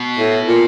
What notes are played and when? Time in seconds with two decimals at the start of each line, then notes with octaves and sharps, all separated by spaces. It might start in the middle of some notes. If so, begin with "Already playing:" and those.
Already playing: B2
0.18 A2
0.48 A#2